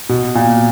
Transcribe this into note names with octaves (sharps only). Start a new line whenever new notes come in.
B2
A#2